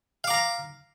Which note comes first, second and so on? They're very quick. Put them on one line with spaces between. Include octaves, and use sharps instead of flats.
F5 D6 A#5